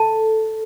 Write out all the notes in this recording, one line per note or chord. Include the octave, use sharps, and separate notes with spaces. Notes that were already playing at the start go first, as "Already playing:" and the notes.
Already playing: A4 A5